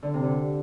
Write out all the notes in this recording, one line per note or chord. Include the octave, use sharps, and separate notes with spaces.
D3
C3
D3